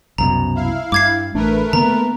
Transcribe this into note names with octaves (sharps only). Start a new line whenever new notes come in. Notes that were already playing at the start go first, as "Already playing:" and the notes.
C2 F#2 B2 A#5
E4 F5
G2 D6 G#6 C7
A1 A3 D4 A#4 B4
D3 A#3 B3 A#5